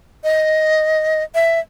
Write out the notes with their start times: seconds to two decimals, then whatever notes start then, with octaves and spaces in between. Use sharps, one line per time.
0.24 D#5
1.35 E5